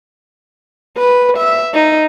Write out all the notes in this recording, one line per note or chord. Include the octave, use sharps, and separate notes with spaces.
B4
E5
D#4